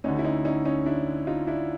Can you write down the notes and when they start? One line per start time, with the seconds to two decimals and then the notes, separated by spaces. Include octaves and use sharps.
0.04 D2 D3 C#4 D#4
0.19 E4
0.24 C#4 D#4
0.45 C#4 D#4
0.65 C#4 D#4
0.86 D4 E4
1.27 D#4 F4
1.47 D4 E4